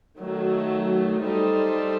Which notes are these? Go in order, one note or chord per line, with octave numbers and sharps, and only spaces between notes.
D#3 F#3 A3
G3 D#4 A4 C5